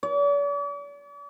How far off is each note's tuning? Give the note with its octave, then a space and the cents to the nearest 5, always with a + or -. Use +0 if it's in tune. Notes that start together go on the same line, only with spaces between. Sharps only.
D5 -45